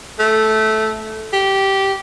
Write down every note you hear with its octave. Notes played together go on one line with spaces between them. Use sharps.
A3
G4